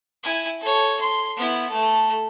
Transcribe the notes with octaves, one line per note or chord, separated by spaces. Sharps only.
E4 G#5
A4 C#5
C6
B3 E4
A3 A4